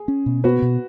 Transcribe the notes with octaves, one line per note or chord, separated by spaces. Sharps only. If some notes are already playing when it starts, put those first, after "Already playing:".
Already playing: G#4
C#4
B2
B3 F#4 B4
B2